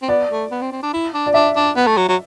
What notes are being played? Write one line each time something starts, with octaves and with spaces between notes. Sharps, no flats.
C4
B3 D5
A3
B3
C4
C4
D4
E4
D4
D5
D4 E5
D4
B3
A3
F#3
F#3